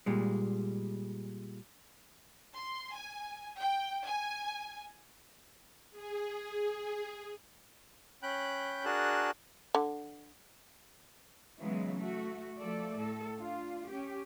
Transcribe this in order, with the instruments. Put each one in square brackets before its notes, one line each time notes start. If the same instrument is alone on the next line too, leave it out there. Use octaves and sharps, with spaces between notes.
[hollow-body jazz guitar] A#2 G3 G#3
[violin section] C6
G#5
G5
G#5
[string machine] G#4
[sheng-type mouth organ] C#4 G5 B5 F#6 G6
D4 F#4 G#4 A#4 A5 F#6
[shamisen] D3
[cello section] C#3 E3 F#3 G#3 B3
A3 F#4
F3 A3 A4 D5
A2 A4
D4 F4
C#4 G4